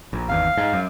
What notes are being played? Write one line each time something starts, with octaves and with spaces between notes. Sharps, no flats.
A#1
G#1 E2 F5
G#2
F#2